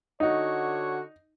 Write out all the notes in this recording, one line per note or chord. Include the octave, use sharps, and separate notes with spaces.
D3 D#4 F#4 C#5